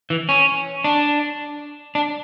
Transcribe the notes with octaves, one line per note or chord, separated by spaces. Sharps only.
E3
C#4
D4
D4